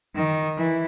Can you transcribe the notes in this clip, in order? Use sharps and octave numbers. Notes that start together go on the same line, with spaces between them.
D#3
E3